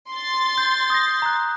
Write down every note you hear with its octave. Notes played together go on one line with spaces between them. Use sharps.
C6 A6
G6
D#6 G6 A#6
A#5 F#6